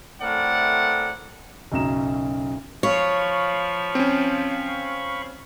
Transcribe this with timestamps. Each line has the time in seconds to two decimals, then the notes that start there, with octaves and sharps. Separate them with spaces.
0.22 A2 A3 C4 A#4 D5 F#5
1.72 B1 F#2 C#3 A#5 E7
2.83 F3 C#5 F5 B5 C#6
3.95 C4 C#4